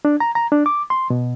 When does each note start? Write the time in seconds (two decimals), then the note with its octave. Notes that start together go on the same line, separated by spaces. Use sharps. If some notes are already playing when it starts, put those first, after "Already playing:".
0.05 D4
0.20 A#5
0.35 A#5
0.52 D4
0.66 D6
0.90 C6
1.10 B2